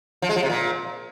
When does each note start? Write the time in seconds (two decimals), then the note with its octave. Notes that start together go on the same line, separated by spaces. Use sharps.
0.22 F3
0.29 G#3
0.36 F3
0.43 C3
0.50 A#2